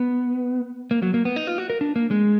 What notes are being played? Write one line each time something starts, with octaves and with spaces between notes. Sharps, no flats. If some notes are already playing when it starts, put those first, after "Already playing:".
Already playing: B3
A#3
F#3
A#3
B3
D#4
F4
F#4
A#4
D4
A#3
G#3